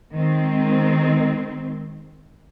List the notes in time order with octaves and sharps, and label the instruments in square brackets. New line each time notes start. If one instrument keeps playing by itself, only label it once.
[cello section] D#3 G#3 C4